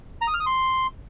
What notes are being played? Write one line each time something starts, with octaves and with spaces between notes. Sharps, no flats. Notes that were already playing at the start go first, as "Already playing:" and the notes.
A#5
D#6
F6
D#6
C6